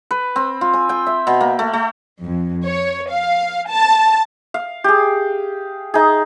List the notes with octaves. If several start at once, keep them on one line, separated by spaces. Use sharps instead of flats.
B4
C4
F4
G#5
G5
E5
B2
A#3
A3
A3
F2
C#5
F5
A5
F5
G4 G#4
D#4 G#4